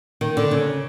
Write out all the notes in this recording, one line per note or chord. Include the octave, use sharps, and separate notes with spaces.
D#3
D3
C#3